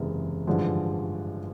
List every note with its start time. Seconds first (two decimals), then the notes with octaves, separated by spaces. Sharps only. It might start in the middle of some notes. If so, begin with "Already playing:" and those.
Already playing: F#1 E2 C3 E3 G#3
0.47 A1 G2 D3 F3 G#3